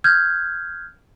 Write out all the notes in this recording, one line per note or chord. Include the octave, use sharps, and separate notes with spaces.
F6 G6 G#6